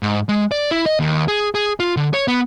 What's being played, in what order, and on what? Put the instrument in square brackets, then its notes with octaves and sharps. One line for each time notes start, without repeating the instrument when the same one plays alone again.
[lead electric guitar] G#2
G#3
D5
E4
D#5
D#2
G#4
G#4
F4
D3
C#5
B3